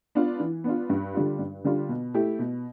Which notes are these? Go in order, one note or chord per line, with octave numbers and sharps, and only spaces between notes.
B3 D4 F4
E3
B3 D4 F4
G2
D3 G3 D4 F4
G2
D3 G3 D4 F4
B2
A3 E4 G4
B2